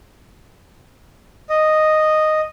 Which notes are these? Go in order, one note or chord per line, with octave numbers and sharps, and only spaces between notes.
D#5